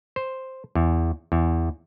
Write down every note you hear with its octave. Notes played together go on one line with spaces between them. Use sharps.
C5
E2
E2